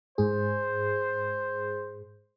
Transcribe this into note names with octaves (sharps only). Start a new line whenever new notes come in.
G#2 G#4 C5